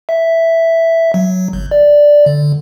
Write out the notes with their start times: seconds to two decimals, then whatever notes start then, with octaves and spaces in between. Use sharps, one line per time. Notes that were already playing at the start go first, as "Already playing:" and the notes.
0.09 E5
1.14 F#3
1.53 G1
1.71 D5
2.26 D3